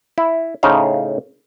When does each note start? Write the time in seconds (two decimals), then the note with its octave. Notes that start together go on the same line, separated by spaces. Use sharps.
0.18 E4
0.63 A2 C#3 D#4 C5 F5